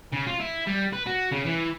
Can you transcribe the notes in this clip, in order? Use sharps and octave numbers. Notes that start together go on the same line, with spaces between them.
C#3
F4
E4
G3
B4
F#4
C#3
E3